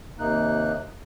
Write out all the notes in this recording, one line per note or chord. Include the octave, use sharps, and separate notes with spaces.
D#2 C3 A#3 D#4 F#6